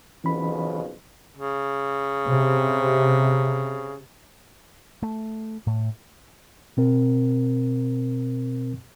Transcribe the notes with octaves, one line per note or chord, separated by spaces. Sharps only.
B1 F2 C#3 E3 C#4 B5
C#3
C3
A3
A2
B2 C4 A#4